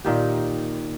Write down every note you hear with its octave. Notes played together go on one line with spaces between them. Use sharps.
A#2 D#3 G4